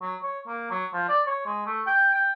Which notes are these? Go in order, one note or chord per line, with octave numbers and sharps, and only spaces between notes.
F#3
C#5
A#3
F#3
F3
D5
C#5
G#3
A3
G5
G5